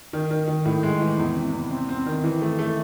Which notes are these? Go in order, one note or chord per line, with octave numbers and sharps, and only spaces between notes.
D#3
D#3
D#3
A2
G#3
E3
E2
C3
E2
C4
C4
D#3
E3
A3
A3